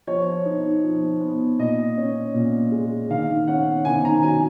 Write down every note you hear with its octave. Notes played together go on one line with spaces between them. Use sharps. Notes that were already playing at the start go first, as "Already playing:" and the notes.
F3 C#5
D#4
F3
B3
A#2 D#5
C#4
A#2
G#3
D#3 F5
C#4 F#5
D#3 G#5
A#5
F#3 G#5